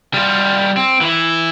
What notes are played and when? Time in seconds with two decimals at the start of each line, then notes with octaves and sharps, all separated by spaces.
0.14 G3 F4
0.77 C4
1.01 E3 E4